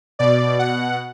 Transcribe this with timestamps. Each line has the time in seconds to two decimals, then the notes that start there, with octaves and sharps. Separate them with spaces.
0.19 B2 D5
0.59 F#5